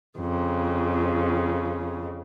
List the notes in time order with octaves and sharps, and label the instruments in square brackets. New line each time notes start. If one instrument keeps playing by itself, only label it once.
[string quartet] F2 C#3